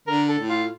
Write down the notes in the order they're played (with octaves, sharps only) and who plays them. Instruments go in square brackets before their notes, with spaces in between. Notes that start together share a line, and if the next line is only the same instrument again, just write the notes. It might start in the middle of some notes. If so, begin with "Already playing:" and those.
[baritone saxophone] D3 [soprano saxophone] A#4
[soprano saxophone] A4
[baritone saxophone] A2
[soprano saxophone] F4